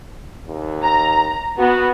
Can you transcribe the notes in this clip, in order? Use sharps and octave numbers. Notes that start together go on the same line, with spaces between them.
D#2
A#5
B3 F#4